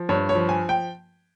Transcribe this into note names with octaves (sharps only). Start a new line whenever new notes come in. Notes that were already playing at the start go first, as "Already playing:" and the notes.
Already playing: F3
G2 C#5
C#5
F3
G#5
G5